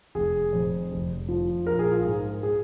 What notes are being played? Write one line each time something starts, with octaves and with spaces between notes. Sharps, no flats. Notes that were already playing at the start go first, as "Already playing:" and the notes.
F1 G#4
F2
F1
F3
A#1 A#4
G#4
F4
G#2 G#4
G#4